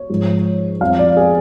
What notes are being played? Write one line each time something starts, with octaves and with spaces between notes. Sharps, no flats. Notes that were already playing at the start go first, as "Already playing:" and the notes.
Already playing: C#5
G#2 F3
F2 F3 F5
D5
G#4